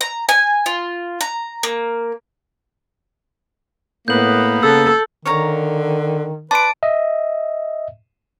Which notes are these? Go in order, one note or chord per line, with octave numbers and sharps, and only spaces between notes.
A#5
G#5
F4
A#5
A#3
A2 A#3 B3 G6 F#7
C#3 A4 E6
D3 D#3 C#5 F5 A#5
B4 D5 A5 C6 D7
D#5 E5